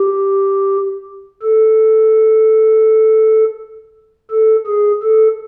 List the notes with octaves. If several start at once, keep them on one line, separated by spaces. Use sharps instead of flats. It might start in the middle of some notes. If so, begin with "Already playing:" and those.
Already playing: G4
A4
A4
G#4
A4